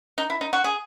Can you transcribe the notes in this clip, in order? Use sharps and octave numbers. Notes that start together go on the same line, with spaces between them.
D#4
E4
D#4
F#4
G#4